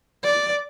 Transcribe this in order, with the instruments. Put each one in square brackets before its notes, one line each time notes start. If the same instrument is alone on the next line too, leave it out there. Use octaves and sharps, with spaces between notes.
[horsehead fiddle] D5